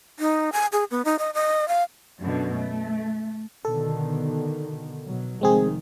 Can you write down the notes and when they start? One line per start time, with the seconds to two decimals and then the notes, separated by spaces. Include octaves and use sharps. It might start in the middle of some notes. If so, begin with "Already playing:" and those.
0.19 D#4
0.53 G#5
0.72 G#4
0.91 B3
1.05 D#4
1.19 D#5
1.34 D#5
1.68 F5
2.20 F#2 B2 D3
2.53 A3
3.65 B2 D3 D#3 A4
5.06 B2 F#3
5.41 F1 D#3 G#3 C4 G#4